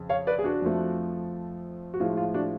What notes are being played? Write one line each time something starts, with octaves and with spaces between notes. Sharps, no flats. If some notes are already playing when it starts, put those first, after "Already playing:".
Already playing: F2 C#3
C#5 F5
B4 D5
G#4
D4 F#4
F2 F3 A3
F#4
A2 F3 G#3 F4
F4
D4 F#4